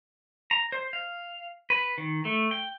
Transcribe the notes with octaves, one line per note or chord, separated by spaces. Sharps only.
A#5
C5
F5
B4
D#3
A3
G5